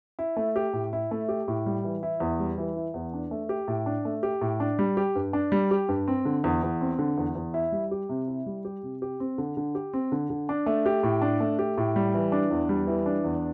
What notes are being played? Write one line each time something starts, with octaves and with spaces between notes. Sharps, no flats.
E4
A3
G4
A2
E4
A3
G4
A2
G3
E3
E4
E2
G3
E3
E4
E2
D4
A3
G4
A2
D4
A3
G4
A2
D4
G3
G4
G2
D4
G3
G4
G2
C4
D3
E2
E2
C4
D3
E2
E2
E4
G3
G4
C3
E4
G3
G4
C3
G4
C4
D3
D3
G4
C4
D3
D3
D4
A3
G4
A2
D4
A3
G4
A2
G3
E3
D4
E2
G3
E3
D4
E2